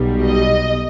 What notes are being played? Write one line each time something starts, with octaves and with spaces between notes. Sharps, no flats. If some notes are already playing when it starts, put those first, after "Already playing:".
Already playing: B1 B2 G3
D#5